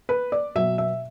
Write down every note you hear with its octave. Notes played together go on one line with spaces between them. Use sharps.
B4
D5
B2 F#3 E5
E5